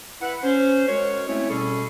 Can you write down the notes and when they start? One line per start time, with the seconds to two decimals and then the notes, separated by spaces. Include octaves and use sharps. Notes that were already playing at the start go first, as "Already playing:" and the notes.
0.21 E4 B4 F#5
0.43 C#4 C5
0.88 G#3 F#4 A#4 C#5
1.28 G#3 A3 C4 C#4 E4 C#5
1.50 B2 G3 C#4 G#4 A4 C#6